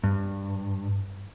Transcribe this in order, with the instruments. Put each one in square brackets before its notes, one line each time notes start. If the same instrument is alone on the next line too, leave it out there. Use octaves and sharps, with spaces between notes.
[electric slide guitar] G2